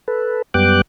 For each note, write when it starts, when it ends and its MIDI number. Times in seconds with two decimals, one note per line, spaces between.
0.08 0.42 69
0.08 0.42 71
0.54 0.81 42
0.54 0.81 55
0.54 0.81 59
0.54 0.81 79
0.54 0.81 86
0.54 0.81 90